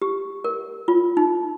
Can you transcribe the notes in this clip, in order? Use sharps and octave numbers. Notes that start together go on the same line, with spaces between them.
G4
A#4
F4
D#4